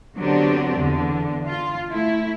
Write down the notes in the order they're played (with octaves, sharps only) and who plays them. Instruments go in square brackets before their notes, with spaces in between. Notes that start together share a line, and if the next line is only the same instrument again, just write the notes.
[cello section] D3 F#3 B3 C4 D4 G4
E2 D3
F4
A3 E4